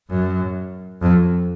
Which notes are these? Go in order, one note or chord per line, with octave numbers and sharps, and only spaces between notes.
F#2
F2